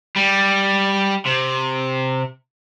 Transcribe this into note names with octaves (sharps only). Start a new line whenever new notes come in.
G3
C3